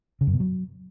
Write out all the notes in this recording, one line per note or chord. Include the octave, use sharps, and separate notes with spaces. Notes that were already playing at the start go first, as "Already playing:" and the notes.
C#3
F#2
B2
F#3